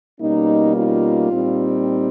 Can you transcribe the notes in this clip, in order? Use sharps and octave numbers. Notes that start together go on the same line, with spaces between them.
B2 G3 A#3 C#4 D#4
D#4 F4
A#2 G3 C4 D#4